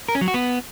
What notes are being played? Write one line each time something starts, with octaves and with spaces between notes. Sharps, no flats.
A#4
C#4
F#3
F#4
B3